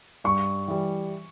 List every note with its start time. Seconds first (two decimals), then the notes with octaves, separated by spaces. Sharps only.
0.24 G2 C#6
0.68 E3 G3